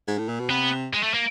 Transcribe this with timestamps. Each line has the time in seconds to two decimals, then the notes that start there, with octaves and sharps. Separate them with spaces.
0.07 G#2
0.18 A2
0.29 A#2
0.40 B2
0.50 C3 B3
0.93 G#3
1.03 A3
1.14 A#3